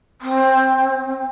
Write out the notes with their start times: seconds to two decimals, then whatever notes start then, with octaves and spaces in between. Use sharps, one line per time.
0.21 C4